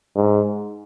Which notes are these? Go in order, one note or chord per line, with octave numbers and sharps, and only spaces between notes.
G#2